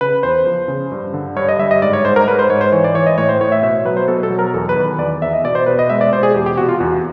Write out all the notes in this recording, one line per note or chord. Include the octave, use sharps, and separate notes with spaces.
C#3 B4
E2 C5
F3
C#3
G2
D3
G2 C#5
D#5
G3 E5
D#5
G#2 D5
C#5
G#2 C5
A#4
G#2 B4
C5
G#2 C#5
C5
E3 C#5
D5
E3 C#5
D#5
A2 C#5
C5
A2 C#5
E5
B2 E5
F#3 B4
C5
B2 A4
A4
F#3
A#4
E2 A4
B4
D#3
E2 D5
E2 E5
D#5
B2 D5
C5
B2 B4
D#5
G#3 E5
D5
B2 C5
G#4
E2 G4
G4
C3 F#4
F4
E2 F#4